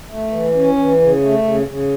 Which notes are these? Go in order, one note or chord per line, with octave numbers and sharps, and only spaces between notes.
A3
E3
C#4
E3
C#3
A3
C#3
C#3